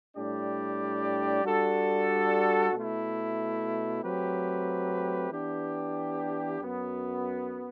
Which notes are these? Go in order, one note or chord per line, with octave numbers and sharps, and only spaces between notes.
A2 G3 D4 G4 D5
G3 D4 F#4 A4
B2 A3 E4
F#3 A3 C4 G4 B4
E3 B3 D4 G4
F#2 F#3 B3